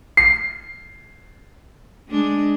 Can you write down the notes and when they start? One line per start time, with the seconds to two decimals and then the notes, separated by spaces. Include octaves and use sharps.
0.17 C7
2.09 G#3 D4